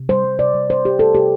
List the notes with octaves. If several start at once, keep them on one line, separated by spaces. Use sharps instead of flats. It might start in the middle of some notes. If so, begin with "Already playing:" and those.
Already playing: C3
G3 C5
G3
C3 D5
G3
G3 C5
G3 G4
G3 A4
C3 G4